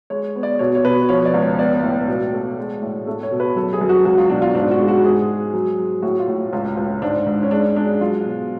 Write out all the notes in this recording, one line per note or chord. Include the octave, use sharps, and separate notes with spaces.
G#3 C#5
B3
D5
B2 C#5
C#5
B2 B4
F3 C#5
D5
C#2
C#5
B3 D5
A2
B2
A3
G#3
A2
A3
C#5
B2
B4
F#2 A4
G#4
F#2
F#4
C#2 F#4
F4
B2 D4
F4
G#2 D4
F#4
G#3
F#4
G#2 G#4
G#3
F#3
F#3
A2 F#4
F4
A2
C#2 F4
C#2
G#2 D4
G#2
C#4
G#3 D4
G#3 D4
F#3 F4
B2